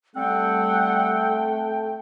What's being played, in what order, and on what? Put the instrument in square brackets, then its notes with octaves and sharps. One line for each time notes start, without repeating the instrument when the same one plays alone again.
[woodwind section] G3 F#5 [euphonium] A3 [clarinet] C4 [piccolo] G5